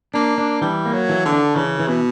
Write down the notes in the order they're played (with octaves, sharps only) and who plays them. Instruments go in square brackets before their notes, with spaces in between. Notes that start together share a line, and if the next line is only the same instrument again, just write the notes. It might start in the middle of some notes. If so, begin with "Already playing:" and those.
[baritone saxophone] A#3 [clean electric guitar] D4
[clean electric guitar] D4
[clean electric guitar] E3 [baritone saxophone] G3
[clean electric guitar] A#3
[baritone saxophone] F#3
[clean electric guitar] E3
[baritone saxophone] D3
[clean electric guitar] D4
[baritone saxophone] C#3 [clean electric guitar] E3
[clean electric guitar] E3
[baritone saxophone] B2